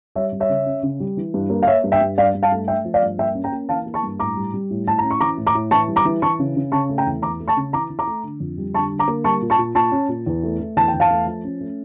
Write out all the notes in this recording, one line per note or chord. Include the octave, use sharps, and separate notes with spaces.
G3 C#5 E5
G3
C#5 E5
C#3
C#4
C#3
G3
E3
G2
A#3
F5
A#3 C#5 E5
G2
E5 G5
G2
G2 D5 F5
G2
F5 A5
A3
A3 E5 G5
F3
D5 F5
G2
A#3 E5 G5
C#4
G5 A#5
A#3
E3 F5 A5
A#3
A5 C#6
G2
A2 A#5 D6
G3
G3
A2
A2 A5
C#4 A#5
C#6
E3 A#5 D6
A2
A#5 D6
A2
E3 A5 C#6
G3
A#5 D6
E3
E3 A5 C#6
C#3
C#3
C#3 A5 C#6
A3
G5 A#5
E2
E3 A#5 D6
A3
A5 C#6
C#3
E3 A#5 D6
E3
A#5 D6
A3
D3
F2
G3
D3 A5 C#6
D3
A#5 D6
A#3
G3 A5 C#6
A#2
A5 C#6
A#2
A#2 A5 C#6
C#4
A#2
E2
A3
A3
E2 A5
G5
E2
F5 A5
A3
F3
C#4
A3